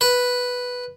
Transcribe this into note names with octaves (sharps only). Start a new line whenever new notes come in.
B4